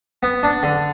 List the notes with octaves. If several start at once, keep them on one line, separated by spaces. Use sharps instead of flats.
B3
D4
D3